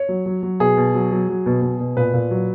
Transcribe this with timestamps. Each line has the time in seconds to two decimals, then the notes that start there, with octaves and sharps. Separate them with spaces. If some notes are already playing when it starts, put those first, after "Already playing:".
Already playing: C#5
0.09 F#3
0.26 F#3
0.43 F#3
0.60 B2 G#4
0.77 B2
0.95 F#3
1.12 F#3
1.29 F#3
1.46 B2
1.62 B2
1.80 B2
1.97 A#2 B4
2.14 A#2
2.31 F#3